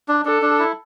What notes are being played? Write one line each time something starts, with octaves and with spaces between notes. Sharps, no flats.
D4
D4 A4
D4
E4